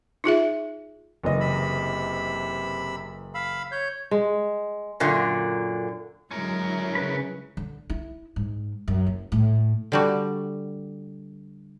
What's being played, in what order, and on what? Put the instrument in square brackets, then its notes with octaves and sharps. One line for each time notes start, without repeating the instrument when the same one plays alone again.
[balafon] D#4 F4 G#4 E5
[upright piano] F#1 E3 D#5
[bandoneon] C3 B5 E6
F5 B5 E6
C#5 G6
[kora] G#3
[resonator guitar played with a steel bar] F#2 A#2 D3
[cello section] D3 F#3 E4 [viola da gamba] G#3 [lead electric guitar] C#4 A#4
[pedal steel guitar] C#3 B4 B5
[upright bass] D3
E4
G#2
F#2
F#1
A2
[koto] D3 G3 F#4